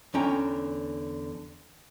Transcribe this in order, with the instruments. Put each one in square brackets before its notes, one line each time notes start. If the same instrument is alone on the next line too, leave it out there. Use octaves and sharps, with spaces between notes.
[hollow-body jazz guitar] E2 D3 C#4 G5 A#5